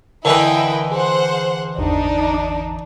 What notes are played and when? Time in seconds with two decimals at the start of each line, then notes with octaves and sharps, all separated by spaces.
0.25 D3 E3 E4 A#4 B4 D#5 G5
0.91 G#4 C5 F#5
1.78 G#1 E2 D4 D#4